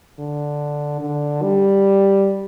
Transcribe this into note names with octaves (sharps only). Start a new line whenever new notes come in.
D3
D3
G3